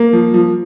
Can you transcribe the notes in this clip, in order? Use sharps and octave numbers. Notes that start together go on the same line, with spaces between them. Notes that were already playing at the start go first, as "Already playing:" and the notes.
Already playing: A#3
F3
F3